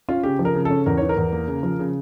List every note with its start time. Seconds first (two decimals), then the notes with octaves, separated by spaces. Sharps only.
0.09 C#4 F4
0.23 C#3 G4
0.39 F3
0.45 A#4
0.55 C#3
0.65 C#4 A4
0.86 E2 A#4
0.97 E3 C#5
1.09 A#4
1.17 E2
1.32 A#3
1.48 C#3
1.63 F3
1.79 C#3